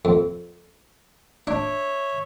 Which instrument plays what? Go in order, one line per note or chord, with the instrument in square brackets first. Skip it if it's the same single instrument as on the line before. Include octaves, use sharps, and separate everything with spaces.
[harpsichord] F2
[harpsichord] D4 [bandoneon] C#5 E5